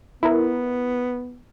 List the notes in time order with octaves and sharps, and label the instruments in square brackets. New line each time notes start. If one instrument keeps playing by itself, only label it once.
[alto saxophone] B3 [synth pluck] E4 A#4